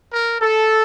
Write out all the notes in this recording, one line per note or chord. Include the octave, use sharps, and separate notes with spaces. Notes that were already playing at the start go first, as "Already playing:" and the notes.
A#4
A4